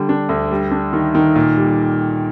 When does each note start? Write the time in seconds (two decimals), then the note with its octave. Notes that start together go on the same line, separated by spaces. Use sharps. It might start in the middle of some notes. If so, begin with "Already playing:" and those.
Already playing: D3 G3
0.09 D4
0.29 D2
0.51 G3
0.71 D4
0.93 D#3
1.15 D#3
1.35 A#2
1.57 G3